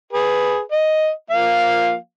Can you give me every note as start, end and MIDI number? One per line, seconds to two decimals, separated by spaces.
0.13 0.60 68
0.13 0.60 71
0.72 1.10 75
1.30 1.95 53
1.30 1.95 58
1.30 1.95 77